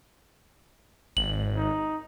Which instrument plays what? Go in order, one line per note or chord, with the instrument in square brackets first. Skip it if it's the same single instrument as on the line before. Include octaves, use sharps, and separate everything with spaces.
[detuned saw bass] G#1 [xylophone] F#7
[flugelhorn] D#4